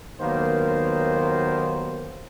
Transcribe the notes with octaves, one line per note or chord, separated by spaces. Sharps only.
D#2 D#3 F#3 A#3 B3 C5